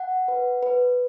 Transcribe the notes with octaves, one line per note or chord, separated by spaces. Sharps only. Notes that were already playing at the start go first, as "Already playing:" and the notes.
Already playing: F#5
B4
B4